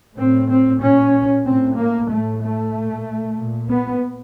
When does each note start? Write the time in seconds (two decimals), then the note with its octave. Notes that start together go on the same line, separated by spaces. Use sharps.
0.15 A2 C4
0.48 C4
0.80 A#2 C#4
1.45 A2 C4
1.77 A#3
2.09 A2 A3
2.42 A3
2.74 A#2
3.38 A#2
3.71 B3